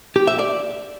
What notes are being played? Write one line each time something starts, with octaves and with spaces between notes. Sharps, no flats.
G4
E5
D5